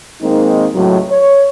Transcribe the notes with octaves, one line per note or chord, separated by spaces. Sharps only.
D#3 G#3 A#3 C4 D#4
C#2 A2 F#3
C#5